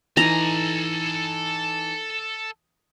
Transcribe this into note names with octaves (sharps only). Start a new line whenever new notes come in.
E3 D#4 A4 G#5 A#5